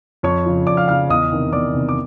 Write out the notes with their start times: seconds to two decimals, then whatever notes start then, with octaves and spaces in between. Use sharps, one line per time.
0.23 F2 C#5 C#6
0.46 C#3 F3
0.67 F2 D5 D6
0.77 F5 F6
0.88 C#3 F3 F5 F6
1.09 E2 D#5 D#6
1.32 C3 D#3
1.53 E2 D5 D6
1.74 C3 D#3
1.89 D6